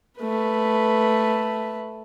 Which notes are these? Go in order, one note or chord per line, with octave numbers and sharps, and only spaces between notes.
A3 B4